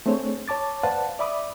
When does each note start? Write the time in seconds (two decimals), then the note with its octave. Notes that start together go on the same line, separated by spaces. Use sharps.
0.06 A3 C4 D4 G#4 C5 C#5
0.48 C#5 A5 D6 A6
0.83 B4 C5 D5 F5 F#5 A5
1.19 D5 E5 B5 D6 D#6